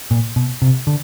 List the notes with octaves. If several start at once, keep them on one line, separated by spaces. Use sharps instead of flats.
A#2
B2
C3
D3